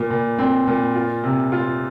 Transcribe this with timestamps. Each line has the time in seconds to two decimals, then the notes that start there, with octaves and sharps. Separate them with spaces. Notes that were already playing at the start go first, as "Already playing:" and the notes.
Already playing: A#2
0.10 A#2
0.38 C4
0.67 A#2
0.95 F4
1.23 C3
1.52 F4